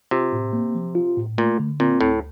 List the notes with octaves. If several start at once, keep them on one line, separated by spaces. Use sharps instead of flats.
C3 F4
A2
A#3
F3
F4
A2
A#2 A3
D3
A#2 C4
D2 A2